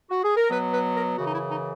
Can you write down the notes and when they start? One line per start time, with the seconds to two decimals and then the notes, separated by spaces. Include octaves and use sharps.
0.10 F#4
0.23 G#4
0.36 A#4
0.50 B2 F#3 B3 B4
0.72 B4
0.95 A#4
1.17 F#2 C#3 E3 F#4
1.25 D#4
1.33 E4
1.50 D#4